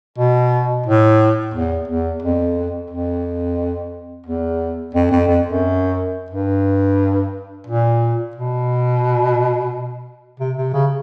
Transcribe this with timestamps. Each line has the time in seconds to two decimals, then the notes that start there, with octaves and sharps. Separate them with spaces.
0.18 B2
0.86 A2
1.54 E2
1.88 E2
2.22 F2
2.90 F2
4.26 E2
4.95 F2
5.11 F2
5.28 F2
5.46 F#2
6.30 G2
7.67 A#2
8.35 B2
10.39 C3
10.57 C3
10.74 C#3